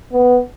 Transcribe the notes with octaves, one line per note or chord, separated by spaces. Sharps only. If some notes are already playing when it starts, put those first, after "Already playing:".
B3